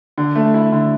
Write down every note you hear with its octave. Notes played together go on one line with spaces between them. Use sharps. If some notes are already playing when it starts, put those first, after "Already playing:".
D3
A3
E4
D3